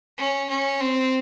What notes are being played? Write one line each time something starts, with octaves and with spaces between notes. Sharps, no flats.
C#4
C#4
C4